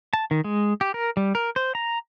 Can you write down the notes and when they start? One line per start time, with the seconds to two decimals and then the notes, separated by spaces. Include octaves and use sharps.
0.13 A5
0.31 D#3
0.44 G#3
0.81 G4
0.94 A#4
1.17 G3
1.35 A#4
1.56 C5
1.75 A#5